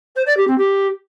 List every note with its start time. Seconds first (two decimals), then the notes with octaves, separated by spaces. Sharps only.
0.16 C5
0.26 D5
0.37 G4
0.47 C4
0.58 G4